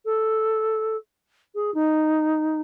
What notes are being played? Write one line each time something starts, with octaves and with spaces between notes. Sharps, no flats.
A4
G#4
D#4